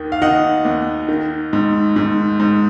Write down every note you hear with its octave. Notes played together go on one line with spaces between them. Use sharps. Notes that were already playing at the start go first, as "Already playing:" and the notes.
Already playing: D#2 D#3
F5
D#3 D#5 F#5
D#2
D#3
G#2
G#2
G#2